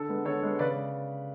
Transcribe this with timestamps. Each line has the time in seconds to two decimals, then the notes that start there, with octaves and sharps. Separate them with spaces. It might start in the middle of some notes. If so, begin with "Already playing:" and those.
Already playing: D3 A4
0.08 G#3 B3
0.25 D3 A4 C#5
0.42 G#3 B3
0.59 C#3 B4 D5